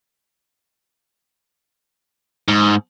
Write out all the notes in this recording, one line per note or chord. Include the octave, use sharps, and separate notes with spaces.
G#2